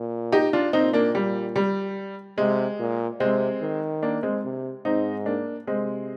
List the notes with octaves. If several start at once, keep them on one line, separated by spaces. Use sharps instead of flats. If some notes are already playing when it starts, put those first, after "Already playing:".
Already playing: A#2
D#4 G4
D4 F4
A#2 C4 D#4
A#3 D4
G3
G3
C3 G#3
A#2
C3 G#3 C4
D#3
A#3 D4
G#3 C4
C3
G#2 C4 D#4
A#3 D4
C3 G#3 C4